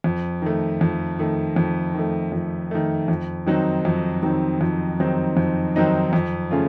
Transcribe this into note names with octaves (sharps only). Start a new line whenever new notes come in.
F2
D#3 A3
F2
D#3 A3
F2
D#3 A3
F2
D#3 A3
F2
D#3 F#3 C4 D#4
F2
D#3 F#3 C4 D#4
F2
D#3 F#3 C4 D#4
F2
D#3 F#3 C4 D#4
F2
C#3 A3 C#4 F4